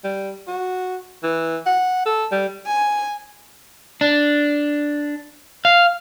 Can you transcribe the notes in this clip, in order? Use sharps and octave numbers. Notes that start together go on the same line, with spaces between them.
G3
F#4
E3
F#5
A4
G3
G#5
D4
F5